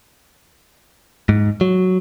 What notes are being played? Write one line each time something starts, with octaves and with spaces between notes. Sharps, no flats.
G#2
F#3